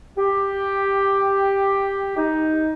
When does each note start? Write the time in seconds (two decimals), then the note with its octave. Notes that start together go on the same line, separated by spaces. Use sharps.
0.18 G4
2.17 D#4